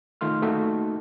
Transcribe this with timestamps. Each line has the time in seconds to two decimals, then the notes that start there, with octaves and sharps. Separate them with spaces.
0.21 D#3 A3 F4 C6 F6
0.42 A3 A#3 D#4 F#4 A4 E5